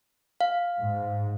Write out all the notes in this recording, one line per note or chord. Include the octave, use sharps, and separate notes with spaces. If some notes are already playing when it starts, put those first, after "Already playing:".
F5
G#2